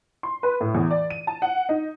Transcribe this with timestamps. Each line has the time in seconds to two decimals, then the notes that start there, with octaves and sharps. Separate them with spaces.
0.23 C6
0.43 B4
0.61 A2
0.75 E2
0.91 D5
1.10 D#7
1.27 A5
1.42 F#5
1.69 D#4